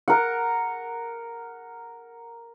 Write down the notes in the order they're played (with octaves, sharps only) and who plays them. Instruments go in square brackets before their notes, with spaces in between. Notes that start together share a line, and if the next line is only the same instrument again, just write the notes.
[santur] A#4 F#5